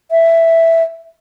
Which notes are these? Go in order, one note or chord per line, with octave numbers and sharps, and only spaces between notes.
E5